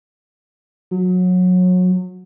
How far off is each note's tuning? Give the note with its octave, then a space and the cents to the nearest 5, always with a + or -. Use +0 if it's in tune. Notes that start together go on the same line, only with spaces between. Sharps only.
F#3 -25